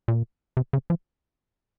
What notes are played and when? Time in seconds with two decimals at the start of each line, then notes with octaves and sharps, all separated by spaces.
0.08 A#2
0.57 C3
0.73 C#3
0.90 F3